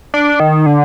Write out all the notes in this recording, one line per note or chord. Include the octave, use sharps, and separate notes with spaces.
D4
D#3
D3